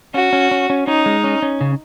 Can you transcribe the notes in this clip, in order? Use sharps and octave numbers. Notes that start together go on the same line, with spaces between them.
C#4 F#4
C#4
C#4
C#4
C#4 D#4
G#3
C#4
C#4
C#3